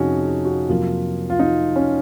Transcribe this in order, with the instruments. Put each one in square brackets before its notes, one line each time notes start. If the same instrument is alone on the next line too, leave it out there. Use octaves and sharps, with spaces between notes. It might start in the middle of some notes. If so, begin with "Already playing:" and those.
Already playing: [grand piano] F2 C3 F3 C#4 D#4 F#4 G#4
G#4
F#4
F2 C3 F#3 A#3 F4
F4
D#4
C#4